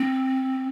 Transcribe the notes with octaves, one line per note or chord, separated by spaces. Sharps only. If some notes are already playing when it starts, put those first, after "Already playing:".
Already playing: C4